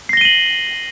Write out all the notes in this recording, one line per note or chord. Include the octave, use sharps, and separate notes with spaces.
A#6 C7 D#7 F#7 G7